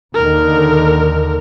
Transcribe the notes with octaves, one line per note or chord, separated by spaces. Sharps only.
D#2 D3 D#3 A#4